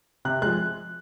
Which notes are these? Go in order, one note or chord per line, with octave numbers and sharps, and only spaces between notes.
C3 F#6
F3 G#3 F#6